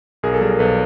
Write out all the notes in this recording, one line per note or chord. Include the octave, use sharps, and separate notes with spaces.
B1 G#4 A#4
A4
G3 G#4 A#4
B1 A4 B4